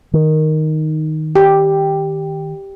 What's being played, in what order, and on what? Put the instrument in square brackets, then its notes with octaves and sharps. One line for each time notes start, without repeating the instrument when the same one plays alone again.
[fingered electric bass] D#3
[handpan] G4